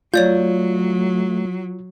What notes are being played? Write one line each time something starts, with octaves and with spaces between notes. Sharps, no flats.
F#3 A3 F4 C#5 D5 G6